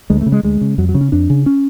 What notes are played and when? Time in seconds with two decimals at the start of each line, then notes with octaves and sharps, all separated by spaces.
0.10 D2 G#3
0.21 A3
0.26 C#3
0.32 G#3
0.43 D2 G#3
0.61 C#3
0.78 F2 F#3
0.89 F#3
0.95 C#3
1.01 C#4
1.12 F2 D4
1.30 C#3
1.46 C#4